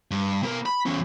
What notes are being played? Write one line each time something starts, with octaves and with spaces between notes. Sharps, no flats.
G2
B2 A#4
B5
E2 C#4